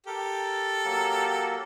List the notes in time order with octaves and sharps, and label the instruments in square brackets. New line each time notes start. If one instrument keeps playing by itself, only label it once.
[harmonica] G4 A4 [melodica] A#4
[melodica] F#3 A#3 A#4